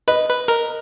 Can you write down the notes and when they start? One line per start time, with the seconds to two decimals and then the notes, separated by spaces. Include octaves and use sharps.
0.08 B4 D#5
0.29 B4
0.48 A#4